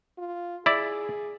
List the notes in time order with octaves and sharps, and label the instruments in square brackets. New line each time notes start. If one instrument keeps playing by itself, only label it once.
[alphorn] F4
[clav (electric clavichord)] E4 D5 [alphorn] G#4